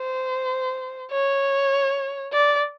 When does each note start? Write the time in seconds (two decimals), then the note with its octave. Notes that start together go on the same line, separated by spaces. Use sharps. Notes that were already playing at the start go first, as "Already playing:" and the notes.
Already playing: C5
1.11 C#5
2.33 D5